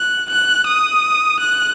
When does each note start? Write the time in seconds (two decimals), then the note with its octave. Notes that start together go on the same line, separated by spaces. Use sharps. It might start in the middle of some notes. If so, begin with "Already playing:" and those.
Already playing: F#6
0.30 F#6
0.66 D#6
1.40 F#6